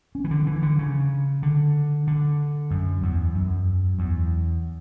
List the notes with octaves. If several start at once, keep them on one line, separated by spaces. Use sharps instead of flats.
C#4
E3
D3
E3
D3
C#3
D3
D3
F#2
E2
F#2
E2